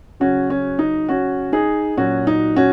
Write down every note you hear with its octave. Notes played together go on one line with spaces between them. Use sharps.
C#3 F#3 C#4 F#4
C#4
D#4
C#4 F#4
D#4 G#4
A#2 F#3 C#4 F#4
D#4
C#4 F#4